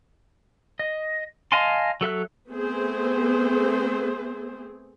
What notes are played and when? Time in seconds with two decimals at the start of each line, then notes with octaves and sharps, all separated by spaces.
0.79 D#5
1.52 D#5 F5 G#5 A5 C6
2.01 F#3 A4 E5 F#6
2.49 A3 B3 C4 G#4 C5